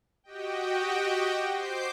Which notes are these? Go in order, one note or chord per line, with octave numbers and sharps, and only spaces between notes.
F#4 G4 D#5 G5
C5 D6 G6 C7